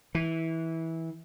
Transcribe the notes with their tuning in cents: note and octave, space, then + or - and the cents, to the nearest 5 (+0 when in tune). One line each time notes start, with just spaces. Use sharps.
E3 -20